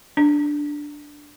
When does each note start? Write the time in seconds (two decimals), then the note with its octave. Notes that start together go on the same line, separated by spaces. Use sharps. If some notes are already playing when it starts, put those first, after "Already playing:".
0.17 D4